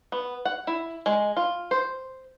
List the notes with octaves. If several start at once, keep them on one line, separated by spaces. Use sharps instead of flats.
B3
F#5
E4
G#3
F4
C5